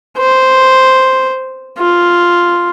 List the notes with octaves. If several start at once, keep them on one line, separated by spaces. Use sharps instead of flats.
C5
F4